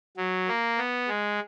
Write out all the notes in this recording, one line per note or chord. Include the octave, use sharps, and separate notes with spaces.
F#3
A#3
B3
G#3